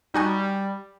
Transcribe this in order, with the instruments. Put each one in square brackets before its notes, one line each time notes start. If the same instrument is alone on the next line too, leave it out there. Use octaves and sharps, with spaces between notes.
[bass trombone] G3 [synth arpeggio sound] D#4 F#4 G#5